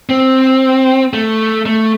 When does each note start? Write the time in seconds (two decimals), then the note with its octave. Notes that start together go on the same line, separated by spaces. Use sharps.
0.09 C4
1.13 A3
1.66 A3